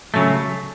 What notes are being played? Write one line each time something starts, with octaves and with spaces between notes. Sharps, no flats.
C#3 F#3 A3